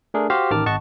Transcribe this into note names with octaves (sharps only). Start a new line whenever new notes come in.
A3 D4 G#4 A#4
F#4 G4 C5 F5
A1 D#3 A#4 A5 D6 F6
G#1 D#5 F#5 A5 C#6